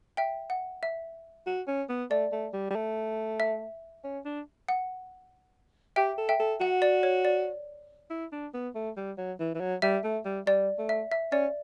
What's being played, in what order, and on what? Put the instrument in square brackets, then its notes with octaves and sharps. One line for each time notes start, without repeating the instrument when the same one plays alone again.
[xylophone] E5 G5
F#5
E5
[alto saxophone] F#4
C#4
B3
[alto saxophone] A3 [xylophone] D5
[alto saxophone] A3
G3
G3
A3
[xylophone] E5
[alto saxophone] C#4
D4
[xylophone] F#5
[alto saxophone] G4 [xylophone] E5 G5
[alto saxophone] A4
[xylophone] E5 G5
[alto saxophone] A4
[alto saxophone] F#4 [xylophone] F#5
[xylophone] D5
C#5
D5
[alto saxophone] E4
D4
B3
A3
G3
F#3
E3
E3
F#3
[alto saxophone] G3 [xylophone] E5
[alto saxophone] A3
G3
[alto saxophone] G3 [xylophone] D5
[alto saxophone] A3
[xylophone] E5
E5
[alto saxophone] C#4 [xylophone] D5